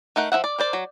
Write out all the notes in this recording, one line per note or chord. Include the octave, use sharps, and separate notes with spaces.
A3 D#4 A#4 F#5
F3 E4 E5 F#5
D5
A#4 C5 D5
F#3